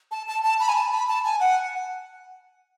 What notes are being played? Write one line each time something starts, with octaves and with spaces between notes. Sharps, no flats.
A5
A5
A5
B5
G#5
A5
B5
A5
G#5
F#5